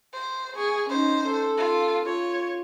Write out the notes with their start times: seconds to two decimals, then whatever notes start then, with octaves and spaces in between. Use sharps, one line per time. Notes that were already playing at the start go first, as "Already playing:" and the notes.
0.14 C5
0.56 G#4 C#6
0.89 C#4 D#4 C5
1.27 A4
1.57 F4
2.05 F4 C#5